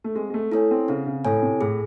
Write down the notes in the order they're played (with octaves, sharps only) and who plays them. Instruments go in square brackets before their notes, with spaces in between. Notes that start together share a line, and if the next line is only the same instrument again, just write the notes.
[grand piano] A3
[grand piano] G#3 [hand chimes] C4
[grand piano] G#3
A3
[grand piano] A3 [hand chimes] E4 A4 C#5 G#5
[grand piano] C4
[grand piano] C#3 [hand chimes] C4
[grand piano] C#3
[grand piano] A2 [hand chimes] E4 A4 C#5 G#5
[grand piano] C3
[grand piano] A2 [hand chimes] G#4